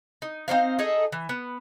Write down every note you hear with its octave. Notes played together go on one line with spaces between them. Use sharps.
D#4
C4 D#4 C5 F5
D#4 G#4 A4 D#5
E3
B3